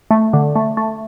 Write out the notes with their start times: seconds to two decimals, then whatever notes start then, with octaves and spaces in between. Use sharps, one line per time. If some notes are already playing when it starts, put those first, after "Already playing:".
0.11 A3
0.33 D3
0.56 A3
0.77 A3